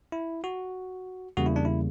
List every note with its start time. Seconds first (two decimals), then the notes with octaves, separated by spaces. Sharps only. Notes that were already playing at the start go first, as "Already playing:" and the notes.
0.12 E4
0.44 F#4
1.37 E2 C#3 G3 A#3 F#4
1.46 E4
1.56 D4
1.65 E4